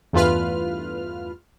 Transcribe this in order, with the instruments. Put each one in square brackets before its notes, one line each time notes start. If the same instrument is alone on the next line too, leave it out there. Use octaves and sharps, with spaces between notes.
[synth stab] E2 G2 A3 F4 B4 F6